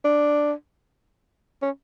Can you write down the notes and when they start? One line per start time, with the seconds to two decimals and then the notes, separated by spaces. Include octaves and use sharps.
0.05 D4
1.62 C#4